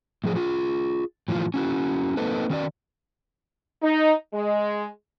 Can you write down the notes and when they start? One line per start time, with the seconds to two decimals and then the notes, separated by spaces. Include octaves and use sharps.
0.24 A2 F3 G#4
0.36 F4 G#4
1.28 A2 E3 F3 F4
1.54 C#4 E4 F#4
2.17 A#3 C4 D#4 A4 B4
2.50 D#3 C#4 F#4 D5
3.82 D#4
4.33 G#3